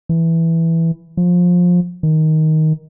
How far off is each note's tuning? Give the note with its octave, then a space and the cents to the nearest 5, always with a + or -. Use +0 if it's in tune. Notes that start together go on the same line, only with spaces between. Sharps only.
E3 +0
F3 +20
D#3 +10